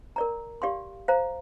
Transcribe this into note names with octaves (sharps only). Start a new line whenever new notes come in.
A#4 D5 A#5
G4 D5 F5 C6
C5 F5 A#5